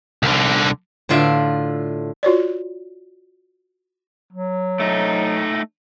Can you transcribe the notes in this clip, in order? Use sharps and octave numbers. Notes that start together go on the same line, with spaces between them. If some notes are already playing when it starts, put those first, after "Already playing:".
C2 D3
A2 D3 F4 D5 E5
F4 F#4 C#5 D5
F#3
A3 D#4